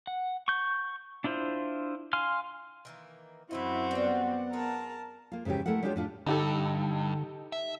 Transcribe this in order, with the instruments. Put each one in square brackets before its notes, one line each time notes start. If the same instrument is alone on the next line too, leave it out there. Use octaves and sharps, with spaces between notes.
[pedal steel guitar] F#5
C#6 G6
D4 E4 F4 C5
F5 G#5 C6 F6
[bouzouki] D#3 E3 A#3
[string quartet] F#2 C4 F#4 [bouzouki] E3 B4 D#5 [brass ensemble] E4
[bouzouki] G3 F4 [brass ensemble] B3 D5 F#5
[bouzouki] F4 G#4 [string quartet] A#4 A5
[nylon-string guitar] A#3 F4
G#2 C#3 E3 C#4 G4
A3 E4 A4 A#4 F#5
G3 G#3 D4 F4 G4 C#5
A2 D4 F4
[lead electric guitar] G2 [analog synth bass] D3 [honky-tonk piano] D#4 G4 A4
[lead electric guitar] E5